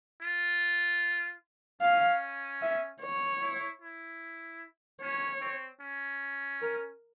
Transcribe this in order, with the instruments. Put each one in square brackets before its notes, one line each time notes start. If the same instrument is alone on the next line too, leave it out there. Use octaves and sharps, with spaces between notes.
[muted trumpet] F4
[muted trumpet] C#4 [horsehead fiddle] F5
[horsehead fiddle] E5
C#5
[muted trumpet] E4
E4
[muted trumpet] C#4 [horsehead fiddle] C#5
[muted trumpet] C4
C#4
[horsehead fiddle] A#4